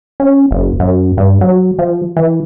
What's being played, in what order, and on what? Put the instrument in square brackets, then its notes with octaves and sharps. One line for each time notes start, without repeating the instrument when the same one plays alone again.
[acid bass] C#4
F#1
F#2
G2
F#3
F3
E3